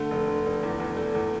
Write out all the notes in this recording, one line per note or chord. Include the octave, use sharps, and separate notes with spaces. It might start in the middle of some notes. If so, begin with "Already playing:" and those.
Already playing: D3 A3
F1
D3
F1
E2
E2
A3
E2